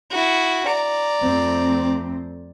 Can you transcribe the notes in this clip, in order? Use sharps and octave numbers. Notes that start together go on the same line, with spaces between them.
E4 F#4
D5 A#5
F2 A3 C4